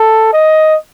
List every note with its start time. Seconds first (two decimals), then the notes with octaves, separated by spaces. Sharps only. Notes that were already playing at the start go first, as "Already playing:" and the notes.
Already playing: A4
0.33 D#5